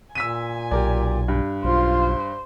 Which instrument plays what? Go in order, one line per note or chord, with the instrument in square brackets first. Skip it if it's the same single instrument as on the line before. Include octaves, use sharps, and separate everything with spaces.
[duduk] A#2 [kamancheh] G#5 [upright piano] E6 B6 D#7
[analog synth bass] B1 [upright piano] G4 A#4 D5
[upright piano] G2
[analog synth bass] B1 [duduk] F4 [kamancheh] C5